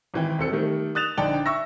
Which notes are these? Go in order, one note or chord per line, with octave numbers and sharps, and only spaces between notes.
G#1 E3 G5
E1 C4 A4 C#7
D#3 G3 A3
D#6 F#6 A6 E7 F7
A#1 D3 D#4 D5 G5 A5
E5 C#6 E6 A#6